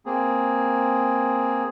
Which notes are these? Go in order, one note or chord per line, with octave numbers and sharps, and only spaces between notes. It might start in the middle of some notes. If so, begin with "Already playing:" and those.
A#3 C4 G#4